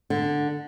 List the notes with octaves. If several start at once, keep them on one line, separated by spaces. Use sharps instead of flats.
D3